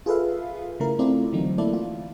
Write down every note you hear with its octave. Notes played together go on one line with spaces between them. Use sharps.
F4 G#4 A4 B4 E5 F5
C#3 A3 E4 A#4
A3 C4 E4 F4 A4 D5
D3 E3 F#3 A3 C4 D#4
A3 A#3 E4 A4 D5
F4